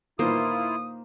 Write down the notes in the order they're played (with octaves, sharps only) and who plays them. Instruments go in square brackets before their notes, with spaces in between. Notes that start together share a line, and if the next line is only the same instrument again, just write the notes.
[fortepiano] A#2 D#3 E3 [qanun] A#3 C5 [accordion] E4 F4 [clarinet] D#6